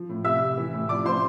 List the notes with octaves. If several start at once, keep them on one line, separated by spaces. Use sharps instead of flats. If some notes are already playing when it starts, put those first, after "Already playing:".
Already playing: F3
A2
C3 E5 E6
C3
E3
A2
F3 D5 D6
A2 C5 C6